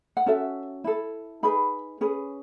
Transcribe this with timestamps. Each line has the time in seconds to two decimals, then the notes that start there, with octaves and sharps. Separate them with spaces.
0.17 F#5
0.26 C#4 F#4 A4 E5
0.84 E4 A4
1.43 D#4 G#4 B4 B5
2.01 C#4 G#4 B4